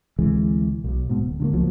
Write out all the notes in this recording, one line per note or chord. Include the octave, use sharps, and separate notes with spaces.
D2 C3 E3 G#3
B1
G#2 B2
D1
D3 F3 A#3
C#2 F3 F#3 A#3